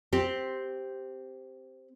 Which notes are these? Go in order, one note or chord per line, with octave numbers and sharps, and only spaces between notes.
C4 G4